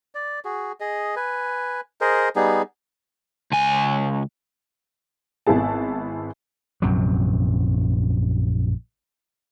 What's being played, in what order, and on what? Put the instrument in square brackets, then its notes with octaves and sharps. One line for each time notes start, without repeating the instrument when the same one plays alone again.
[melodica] D5
F#4 G#4
G#4 D#5
B4 G#5
G#4 A#4 C5 D#5
G3 B3 D#4 G#4
[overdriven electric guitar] C#2 G#5
[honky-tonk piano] G#1 B3 E4 G#4 A5
[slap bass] A#1 F#2 C3 F#3